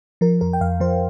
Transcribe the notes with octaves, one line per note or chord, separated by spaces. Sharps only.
F3 A#4
F2 A#4
G5
F2 F5
F3 C5